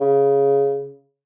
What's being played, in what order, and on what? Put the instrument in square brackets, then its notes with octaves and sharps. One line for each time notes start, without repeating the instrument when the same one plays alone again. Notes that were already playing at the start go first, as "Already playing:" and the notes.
[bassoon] C#3